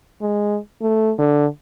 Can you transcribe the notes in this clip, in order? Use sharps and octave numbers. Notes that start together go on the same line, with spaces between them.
G#3
A3
D3